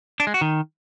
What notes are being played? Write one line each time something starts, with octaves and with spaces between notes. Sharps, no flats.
D4
G#3
F#4
D#3